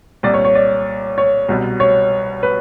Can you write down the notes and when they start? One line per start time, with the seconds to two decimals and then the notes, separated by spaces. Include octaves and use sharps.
0.23 C2 A#2 D5
0.34 C#5
0.45 C#5
0.55 D5
1.18 C#5
1.49 C2 B2
1.80 C#5
2.43 B4